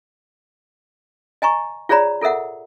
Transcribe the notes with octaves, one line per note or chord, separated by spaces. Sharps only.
D#5 G#5 A#5 C#6
F4 G#4 C#5 D5 A#5 B5
F4 A4 A#4 E5 F#5